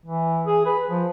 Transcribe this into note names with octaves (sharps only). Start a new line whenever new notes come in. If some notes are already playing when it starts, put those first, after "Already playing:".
E3
G#4
B4
F3